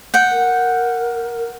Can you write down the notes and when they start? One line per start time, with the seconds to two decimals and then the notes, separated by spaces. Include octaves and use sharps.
0.14 F#5 G5
0.31 A#4